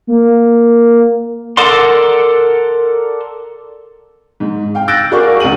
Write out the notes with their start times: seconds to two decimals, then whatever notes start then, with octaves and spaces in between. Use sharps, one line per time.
0.07 A#3
1.57 A4 A#4 D5 F#5 C6
4.40 G#2
4.75 F5 G5
4.88 E6 F#6 G6 A6 A#6 D7
5.11 F#4 G#4 A#4 D5 F5 C#6
5.40 C#2 D4 F#5 D#7 F#7